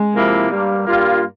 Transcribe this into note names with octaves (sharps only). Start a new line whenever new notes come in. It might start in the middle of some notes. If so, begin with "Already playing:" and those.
Already playing: G#3
C3 F3 A#3 E4
G2 G3 A#3
G2 G3 A#3 F4